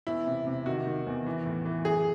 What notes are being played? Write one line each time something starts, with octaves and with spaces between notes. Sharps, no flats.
E2 E4
C3
C3
D#3 F#4
D#3
E2
E3
A2
E3
F#2 G#4